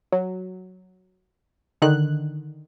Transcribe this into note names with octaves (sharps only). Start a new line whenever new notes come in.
F#3
D3 D#3 F#6